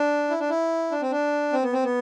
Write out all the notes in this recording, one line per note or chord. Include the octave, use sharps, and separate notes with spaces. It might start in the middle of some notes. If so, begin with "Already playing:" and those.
Already playing: D4
E4
D4
E4
D4
C4
D4
C4
B3
C4
B3